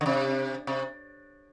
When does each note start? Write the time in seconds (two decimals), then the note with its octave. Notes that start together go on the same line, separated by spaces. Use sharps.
0.01 D3
0.06 C3
0.67 C3